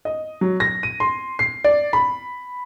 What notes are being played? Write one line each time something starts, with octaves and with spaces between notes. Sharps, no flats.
D#5
F#3
A#6
D#7
C6
C7
D5
B5